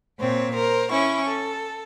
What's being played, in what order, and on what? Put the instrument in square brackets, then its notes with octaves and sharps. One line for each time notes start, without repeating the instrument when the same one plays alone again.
[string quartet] A#2 C4 C#5
A#4 C5
C#4 E4 C#6
A4